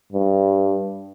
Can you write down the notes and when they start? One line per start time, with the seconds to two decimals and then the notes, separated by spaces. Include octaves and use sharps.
0.12 G2